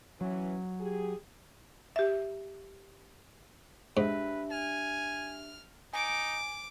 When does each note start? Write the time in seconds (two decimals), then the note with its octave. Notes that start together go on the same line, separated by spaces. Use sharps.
0.21 E3 F#3 C#4
0.81 G4 G#4
1.96 G4 E5
3.97 G#2 D4 G4 B4 E5
4.50 G#5 F6
5.93 D#4 G#5 D6 D7